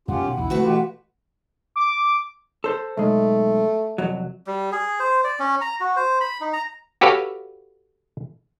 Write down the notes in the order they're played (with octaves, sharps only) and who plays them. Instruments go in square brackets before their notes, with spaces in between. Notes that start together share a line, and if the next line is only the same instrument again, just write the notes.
[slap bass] F#2 A#3 [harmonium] C#4 F4 G4 [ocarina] F#5
[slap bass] B2 D#3
[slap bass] A#1 D#2 E3 [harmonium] E4
[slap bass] D3 G#3 C4 [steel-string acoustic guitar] A3 F#4 B4
[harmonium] B2 F4 G4 [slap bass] E3
[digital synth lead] D6
[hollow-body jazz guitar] A4 C5
[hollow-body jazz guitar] B1 G#3 [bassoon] A3
[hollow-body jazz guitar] C2 F2 F#3
[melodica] G3
G#4
C5
D5
C#4
A#5
F#4
C5
B5
D#4
A#5
[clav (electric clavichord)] F#4 G4 A4 B4 C#5 F5